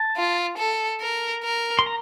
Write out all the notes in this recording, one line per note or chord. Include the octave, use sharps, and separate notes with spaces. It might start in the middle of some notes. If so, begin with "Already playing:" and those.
Already playing: A5
F4
A4
A#4
A#4
C6
A#5